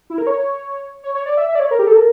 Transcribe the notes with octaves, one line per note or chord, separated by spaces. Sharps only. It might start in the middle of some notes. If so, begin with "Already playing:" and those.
E4
A#4
C#5
C#5
C#5
D5
E5
E5
D5
C#5
A#4
G4
A4
A#4